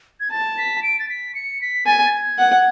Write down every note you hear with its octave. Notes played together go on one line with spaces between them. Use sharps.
G#6
A5 A6
B6
D7
A6
B6
C#7
B6
G#5 A6
A6
G#6
F#5